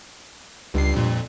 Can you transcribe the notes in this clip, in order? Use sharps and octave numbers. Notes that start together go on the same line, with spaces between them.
C#2 G2 C7
F2 A#2